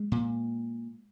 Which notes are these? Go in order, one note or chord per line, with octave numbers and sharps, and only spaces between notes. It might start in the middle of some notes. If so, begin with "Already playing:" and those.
Already playing: G#3
A#2